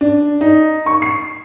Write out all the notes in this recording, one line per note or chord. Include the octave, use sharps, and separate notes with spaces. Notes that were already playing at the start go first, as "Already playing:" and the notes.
D4
D#4
C#6
C7